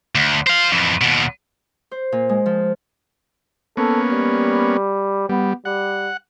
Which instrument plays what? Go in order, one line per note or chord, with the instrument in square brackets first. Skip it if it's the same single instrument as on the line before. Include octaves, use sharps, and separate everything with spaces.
[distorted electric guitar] D2
C5 F5
F2 E3
D#2 B2
[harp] C5
A#2
G#3
F3
[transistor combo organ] A#3 B3 C#4 [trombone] A4
[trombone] G3
[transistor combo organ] G3 [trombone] B3
[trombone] G3 [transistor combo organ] F#5